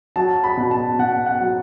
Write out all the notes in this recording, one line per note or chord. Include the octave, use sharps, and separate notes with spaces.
F#3 A5
B5
B2
A5
B2 F#5
F#5
F#3